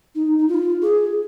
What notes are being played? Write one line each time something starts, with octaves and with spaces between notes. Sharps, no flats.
D#4
D#4
F4
G#4